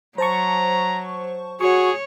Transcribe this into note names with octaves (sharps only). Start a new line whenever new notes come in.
F#3 C5 A5 A#5 C#6
F#4 G#4 C#5 C#6